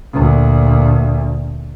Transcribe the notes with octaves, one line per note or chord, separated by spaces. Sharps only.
D2 A#2